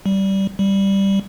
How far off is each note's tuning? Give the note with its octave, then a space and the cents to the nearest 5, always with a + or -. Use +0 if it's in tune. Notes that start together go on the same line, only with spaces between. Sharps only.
G3 -15
G3 +0